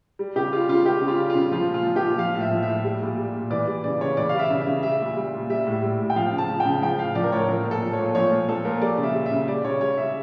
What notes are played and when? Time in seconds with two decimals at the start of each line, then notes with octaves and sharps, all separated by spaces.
0.19 G3
0.36 C#3 G4
0.52 G3 F4
0.69 C#3 F4
0.86 G3 G4
1.02 C#3
1.08 F4
1.19 G3
1.30 F4
1.35 C#3
1.52 F3 F4
1.68 A#2
1.74 F4
1.85 F3
1.96 G4
2.02 A#2
2.18 F3 F5
2.35 A2
2.40 E5
2.51 F3
2.63 A2 E5
2.84 G3
3.02 A#2
3.18 G3
3.35 A#2
3.51 E3 D5
3.67 G3
3.84 C#3 D5
4.01 C#3 C#5
4.17 E3 D5
4.29 G3 F5
4.39 E5
4.51 C#3
4.61 E5
4.67 C#3
4.83 G3 E5
5.00 A#2
5.17 G3
5.33 A#2
5.50 G3 E5
5.67 A2
5.83 G3
6.00 A2
6.10 G5
6.16 F3 F5
6.33 C#3
6.38 A5
6.49 F3
6.60 G5
6.66 C#3
6.82 F3 G5
6.99 A2 F5
7.15 F3 D5
7.24 A#4
7.32 A2 C#5
7.48 F3 A#4
7.65 A#2
7.71 A4
7.82 F3
7.93 C#5
7.98 A#2
8.15 F3 C#5
8.32 A#2
8.48 F3 A4
8.65 A#2 A#4
8.82 G3 D5
8.98 C#3
9.03 E5
9.14 G3
9.26 E5
9.31 C#3
9.48 G3 D5
9.65 C#3 C#5
9.81 G3 C#5
9.97 C#3 E5